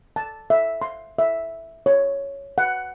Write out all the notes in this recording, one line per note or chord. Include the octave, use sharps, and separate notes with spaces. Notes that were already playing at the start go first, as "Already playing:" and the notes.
A5
E5
C6
E5
C#5
F#5